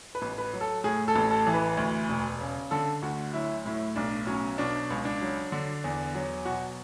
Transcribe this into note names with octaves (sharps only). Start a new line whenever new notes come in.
B4
A1
B4
F#3
A4
A2 G#4
A4
A1
A4
E3
B4
D2
E1
C#3
D3 A4
D2 F#4
F#3 E4
A2 E4
B1 D4
F#3 C#4
B2 D4
C#2
D4
F#3
D3
E2
F#3
B2 F#4